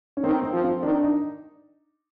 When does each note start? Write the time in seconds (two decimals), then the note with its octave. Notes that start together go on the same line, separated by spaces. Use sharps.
0.17 C#4
0.23 D#3 C4
0.43 C4
0.53 F3
0.64 C4
0.83 D#3 D4
1.03 D#4